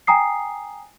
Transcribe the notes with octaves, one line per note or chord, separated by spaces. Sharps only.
G5 G#5 A#5 D#6 C7